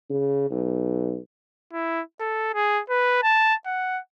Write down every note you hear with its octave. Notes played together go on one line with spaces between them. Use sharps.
C#3
B1
E4
A4
G#4
B4
A5
F#5